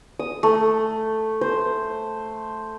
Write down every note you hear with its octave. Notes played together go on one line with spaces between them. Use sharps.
D#6
A3
C5